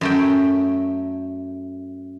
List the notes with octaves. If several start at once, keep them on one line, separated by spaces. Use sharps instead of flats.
F#2 A3 G5